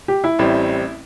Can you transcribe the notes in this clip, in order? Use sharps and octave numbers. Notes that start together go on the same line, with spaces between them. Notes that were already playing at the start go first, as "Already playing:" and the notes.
G4
E4
A1 A2 G3 C4